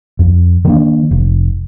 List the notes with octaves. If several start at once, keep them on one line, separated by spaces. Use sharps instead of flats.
F2
D#3 A#3 D4
F1